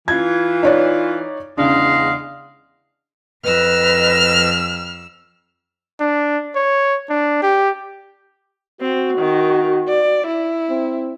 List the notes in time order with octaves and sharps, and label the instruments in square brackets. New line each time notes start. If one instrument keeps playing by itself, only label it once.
[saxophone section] E3 F4 [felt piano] G#6
[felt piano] D#4 C#5 D5
[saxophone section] E2 G#3 F5 [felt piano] C#3 D4
[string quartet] F2 E6 [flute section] B4 D#5 [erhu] F6
[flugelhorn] D4
C#5
D4
G4
[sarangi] C4 [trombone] F#4
[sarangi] D#3
D5
E4
[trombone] C4